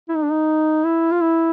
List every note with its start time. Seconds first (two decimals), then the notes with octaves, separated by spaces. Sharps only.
0.09 E4
0.16 D#4
0.24 D4
0.31 D#4
0.85 E4
1.12 F4
1.21 E4